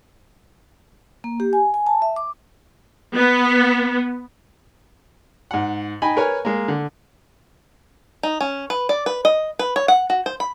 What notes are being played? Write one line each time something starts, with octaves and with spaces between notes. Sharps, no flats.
A#3
G4
G#5
G#5
A5
E5
D6
B3
G#2 F#5
D#4 G5 G#5 B5
A#4 B4 C#5 G#5
G#3 A#3
D3
D#4
C#4
B4
D5
B4
D#5
B4
C#5
F#5
F#4
C5
B5